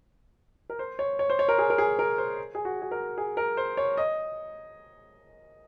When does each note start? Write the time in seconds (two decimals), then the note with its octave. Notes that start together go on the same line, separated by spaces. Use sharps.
0.70 A#4
0.79 C5
0.99 C#5
1.19 C#5
1.30 C5
1.39 C#5
1.48 A#4
1.58 G#4
1.70 A#4
1.78 G#4
1.99 A#4
2.18 C5
2.55 G#4
2.65 F#4
2.82 G#4
2.91 A#4
3.18 G#4
3.37 A#4
3.57 C5
3.77 C#5
3.97 D#5